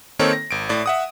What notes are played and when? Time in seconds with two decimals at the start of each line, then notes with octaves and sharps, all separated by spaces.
0.19 D#3 A#3 C4 D#4 A4 C#5
0.33 A#6
0.51 G#1 D7
0.69 A2 D5
0.86 E5 F#5 D#6